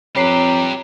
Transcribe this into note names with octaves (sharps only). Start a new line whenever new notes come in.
F2 G4 B4 C#5 A#5 C7